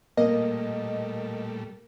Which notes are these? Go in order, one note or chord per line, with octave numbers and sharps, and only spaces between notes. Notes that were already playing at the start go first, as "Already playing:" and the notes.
A#2 G3 A3 A#3 D#5